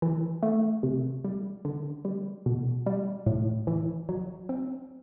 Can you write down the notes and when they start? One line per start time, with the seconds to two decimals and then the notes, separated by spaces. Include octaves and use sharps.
0.02 E3
0.43 A3
0.83 C3
1.25 G3
1.65 D3
2.05 G3
2.46 B2
2.86 G3
3.26 A2
3.67 E3
4.09 F#3
4.49 C4